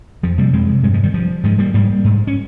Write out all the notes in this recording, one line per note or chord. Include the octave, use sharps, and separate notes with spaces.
F2 F3
C3 G3 A#3
F2 G#3 C4
C3
G2 G#3 C4
F3 G#3
D#3 G3
G2 F3
G#2 F3 G#3
G3 A#3
G#2 G3 A#3
G#2
C#4